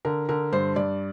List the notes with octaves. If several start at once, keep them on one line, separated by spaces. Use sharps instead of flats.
D3 A#4
D3 A#4
G2 C5
G2 D5